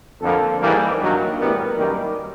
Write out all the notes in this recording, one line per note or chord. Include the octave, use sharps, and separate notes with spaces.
F2 D3 F3 A#3 A4
G#2 E3 G3 A#3
G2 D#3 F#3 A#3
A2 E3 G3 B3 A#4
F#2 D#3 G3 A#3